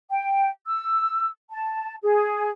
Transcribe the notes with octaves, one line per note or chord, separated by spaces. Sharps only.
G5
E6
A5
G#4